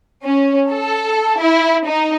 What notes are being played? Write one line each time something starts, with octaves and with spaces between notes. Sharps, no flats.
C#4
A4
E4
D#4